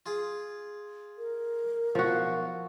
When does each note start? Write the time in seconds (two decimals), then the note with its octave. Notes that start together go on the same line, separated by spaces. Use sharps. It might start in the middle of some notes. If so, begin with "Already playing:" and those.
0.06 F4 G#4
1.18 A#4
1.95 B1 F3 F#4